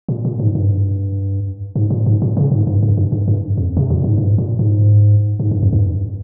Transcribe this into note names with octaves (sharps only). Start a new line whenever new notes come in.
A#2
A#2
G#2
G2
G#2
A#2
G#2
A#2
C#3
G#2
G2
G2
G2
G2
G2
F2
C3
A#2
G#2
G2
A#2
G#2
G#2
G2
F2
G2